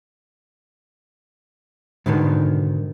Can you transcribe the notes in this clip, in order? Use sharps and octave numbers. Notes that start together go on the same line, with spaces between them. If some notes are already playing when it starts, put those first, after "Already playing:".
G#2 B2 D3 D#3 B3